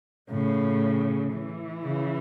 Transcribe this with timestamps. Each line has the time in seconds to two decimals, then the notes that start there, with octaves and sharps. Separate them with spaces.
0.30 A2 C#3
1.33 E3
1.84 C#3